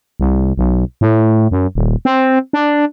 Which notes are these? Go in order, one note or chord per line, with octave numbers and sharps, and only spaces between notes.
C2
B1
A2
F#2
D#1
C4
D4